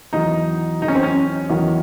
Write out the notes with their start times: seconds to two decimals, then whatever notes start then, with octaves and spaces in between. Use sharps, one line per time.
0.13 E2 D#3 F#3 D#4
0.81 E2 D#3 F#3 D#4
0.88 C#4
0.95 C4
1.03 C#4
1.50 E2 D#3 F#3